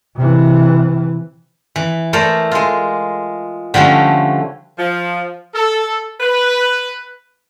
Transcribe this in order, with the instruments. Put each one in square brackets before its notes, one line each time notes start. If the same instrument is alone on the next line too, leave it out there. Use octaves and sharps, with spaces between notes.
[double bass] C3 E3
[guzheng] E3
A3 E4 A4 A#4 C5 D5
G#3 F4
D3 F3 G3 A3 C#4
[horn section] F3
A4
B4